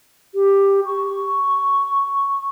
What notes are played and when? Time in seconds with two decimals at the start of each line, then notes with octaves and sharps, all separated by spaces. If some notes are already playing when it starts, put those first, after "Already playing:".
0.34 G4
0.85 C#6